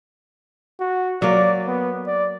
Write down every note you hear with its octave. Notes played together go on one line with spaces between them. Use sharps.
F#4
F#3 A#3 D5
B3
D5